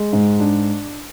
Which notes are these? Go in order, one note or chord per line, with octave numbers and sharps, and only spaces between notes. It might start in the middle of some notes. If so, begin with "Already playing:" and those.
Already playing: G#3
G#2
D4